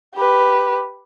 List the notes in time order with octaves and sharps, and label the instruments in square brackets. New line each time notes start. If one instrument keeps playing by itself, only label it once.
[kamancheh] G4 B4